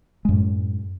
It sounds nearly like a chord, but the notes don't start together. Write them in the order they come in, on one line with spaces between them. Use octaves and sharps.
G#3 F#2 A2